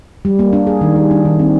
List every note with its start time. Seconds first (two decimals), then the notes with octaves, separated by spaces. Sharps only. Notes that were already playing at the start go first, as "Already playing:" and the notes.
0.25 G3
0.39 A#3
0.53 D4
0.67 G#4
0.81 D#3
0.96 G3
1.11 D4
1.25 D#3
1.39 C4